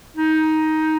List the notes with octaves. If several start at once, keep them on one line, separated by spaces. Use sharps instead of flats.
D#4